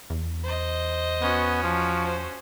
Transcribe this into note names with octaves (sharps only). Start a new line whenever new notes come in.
E2
C5 D#5
B3 C#4 F#4
F3
C5